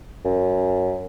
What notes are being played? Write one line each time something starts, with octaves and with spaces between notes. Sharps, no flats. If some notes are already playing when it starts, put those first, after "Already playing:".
F#2